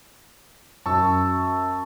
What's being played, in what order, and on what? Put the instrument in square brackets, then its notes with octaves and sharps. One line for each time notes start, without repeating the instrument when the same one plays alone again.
[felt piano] F#2 [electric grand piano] A5 C#6 E6